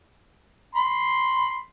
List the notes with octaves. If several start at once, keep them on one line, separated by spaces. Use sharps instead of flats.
B5 C6